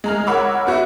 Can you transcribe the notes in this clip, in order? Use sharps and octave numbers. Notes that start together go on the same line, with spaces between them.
G#3 A#5 F6
A#4 C#5 F#5 B5 D6 E6
B3 F#4 E5